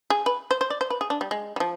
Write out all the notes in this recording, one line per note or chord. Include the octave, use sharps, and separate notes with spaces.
G#4
B4
C5
C5
D5
C5
B4
G#4
D4
G3
G#3
G3
F3